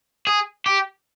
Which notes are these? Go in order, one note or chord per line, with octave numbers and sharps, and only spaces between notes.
G#4
G4